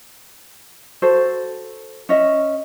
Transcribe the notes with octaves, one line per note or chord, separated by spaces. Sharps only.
F#4 A4 C5
C#4 D#5 E5